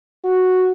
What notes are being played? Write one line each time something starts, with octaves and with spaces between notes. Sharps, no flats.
F#4